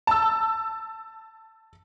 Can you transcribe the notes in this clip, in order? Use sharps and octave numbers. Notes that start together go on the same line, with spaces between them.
A5 E6